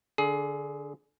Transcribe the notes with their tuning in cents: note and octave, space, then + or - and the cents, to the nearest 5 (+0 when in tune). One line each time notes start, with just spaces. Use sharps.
D3 -5 G#4 +20